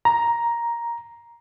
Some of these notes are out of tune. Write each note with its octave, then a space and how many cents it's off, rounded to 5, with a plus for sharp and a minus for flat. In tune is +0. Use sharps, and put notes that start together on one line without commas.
A#5 +10